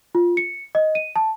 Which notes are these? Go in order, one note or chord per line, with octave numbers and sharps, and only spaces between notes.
F4
C#7
D#5
D#7
A5